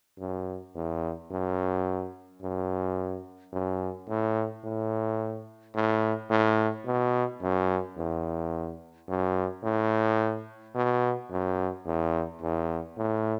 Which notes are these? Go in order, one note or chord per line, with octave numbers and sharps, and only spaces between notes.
F#2
E2
F#2
F#2
F#2
A2
A2
A2
A2
B2
F#2
E2
F#2
A2
B2
F#2
E2
E2
A2